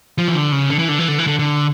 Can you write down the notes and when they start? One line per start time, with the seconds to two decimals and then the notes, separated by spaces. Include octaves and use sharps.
0.18 F3
0.28 E3
0.35 D3
0.52 C#3
0.70 D3
0.79 E3
0.89 D3
0.99 E3
1.08 D3
1.18 E3
1.27 D3
1.39 D3